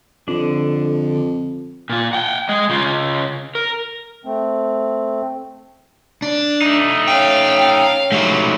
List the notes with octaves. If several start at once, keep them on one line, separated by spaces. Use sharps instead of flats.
F2 D3 D4
A#2 F4
F#5 G5
G#3 D#5
C#3 F4
A#4
A3 C4
D4
A3 D#4
C#4 F5 G5
G#2 F#3 A3 G4